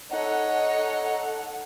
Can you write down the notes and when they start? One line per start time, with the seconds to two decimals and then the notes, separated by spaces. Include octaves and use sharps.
0.11 D#4 A4 C#5 F#5